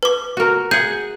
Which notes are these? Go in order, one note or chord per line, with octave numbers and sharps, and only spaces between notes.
B4 D6
F#4 A#4
G#4 F#5 G6